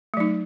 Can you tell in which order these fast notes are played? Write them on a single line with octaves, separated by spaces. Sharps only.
A3 F#3 D#4